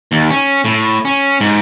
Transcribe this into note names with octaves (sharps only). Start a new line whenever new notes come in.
D#2
C#4
A2
C#4
G#2